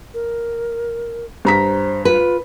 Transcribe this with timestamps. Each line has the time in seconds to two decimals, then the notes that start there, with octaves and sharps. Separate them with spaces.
0.14 A#4
1.45 G2 C5 A#5 B6
2.05 F4 B4